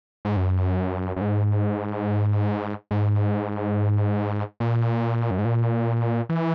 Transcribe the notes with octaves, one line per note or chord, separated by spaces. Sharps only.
G#2
F#2
F#2
G#2
G#2
A#2
F#2
G#2
A#2
E3